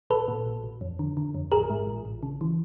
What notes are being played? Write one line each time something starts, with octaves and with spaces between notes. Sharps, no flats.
A#1 A4 B4
A#2
A#1
A#1
F2
D3
D3
F2
A1 G#4 A#4
G#2
A1
A1
C#3
E3